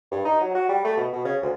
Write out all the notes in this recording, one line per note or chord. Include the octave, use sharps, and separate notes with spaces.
G2
D#4
F#3
F#4
G3
A3
B2
B2
C#3
D2